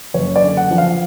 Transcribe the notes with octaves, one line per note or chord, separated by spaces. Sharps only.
F#1 C#5
D5
D3
F#5
F3
F5